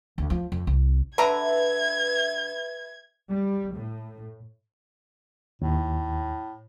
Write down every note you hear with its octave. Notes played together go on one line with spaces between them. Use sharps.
D2
F3
F2
C2
D3 B4 E5 A#5 G#6
G3
A2
D#2 A2